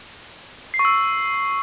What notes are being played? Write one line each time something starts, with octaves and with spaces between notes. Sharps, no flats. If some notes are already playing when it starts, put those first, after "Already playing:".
C7
C#6
E6